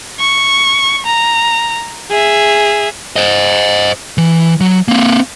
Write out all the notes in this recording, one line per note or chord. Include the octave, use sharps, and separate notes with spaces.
C#6
A#5
G#4 E5
C5 D#5
E3
F#3
A#3 C4